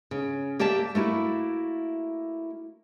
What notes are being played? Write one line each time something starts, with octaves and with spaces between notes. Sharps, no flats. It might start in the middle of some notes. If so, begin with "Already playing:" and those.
C#3
A#3 G4 D5 E5 A5
A3 A#3 E4 F#4